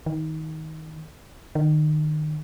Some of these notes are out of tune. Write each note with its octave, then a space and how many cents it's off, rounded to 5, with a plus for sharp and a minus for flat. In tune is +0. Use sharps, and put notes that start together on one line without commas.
D#3 +20
D#3 -30